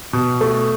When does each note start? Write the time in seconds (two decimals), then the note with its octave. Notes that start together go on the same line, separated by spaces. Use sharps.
0.13 B2
0.41 A3